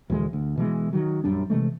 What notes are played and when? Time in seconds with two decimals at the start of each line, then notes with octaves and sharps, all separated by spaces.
0.10 D2 A#2 E3 G#3
0.33 D2
0.57 B2 E3 F#3 G#3
0.93 D#3 F#3
1.24 A#1 F#2 G3 D4
1.50 C3 E3 G#3 A3